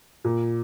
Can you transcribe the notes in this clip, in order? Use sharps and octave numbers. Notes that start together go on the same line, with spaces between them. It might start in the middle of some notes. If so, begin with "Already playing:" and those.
A#2